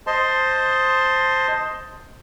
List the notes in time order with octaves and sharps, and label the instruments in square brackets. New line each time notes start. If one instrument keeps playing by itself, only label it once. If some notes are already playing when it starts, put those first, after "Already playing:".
[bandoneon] C5 D#5 A5 C6